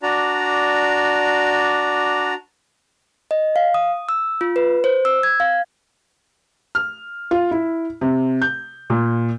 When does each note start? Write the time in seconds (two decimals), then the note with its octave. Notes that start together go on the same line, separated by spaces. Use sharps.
0.03 D4 F#4 D5 A#5
3.31 D#5
3.56 F5
3.74 D#6
4.09 E6
4.41 F4
4.56 B4
4.84 C5
5.05 E6
5.23 G#6
5.40 F5
6.75 F6
7.31 F4
7.51 E4
8.01 C3
8.42 G6
8.90 A#2